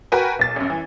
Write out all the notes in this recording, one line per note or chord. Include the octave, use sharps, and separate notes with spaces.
F#4 A#4 B4 G5 G#5
B1 A6
A1 F#2
E3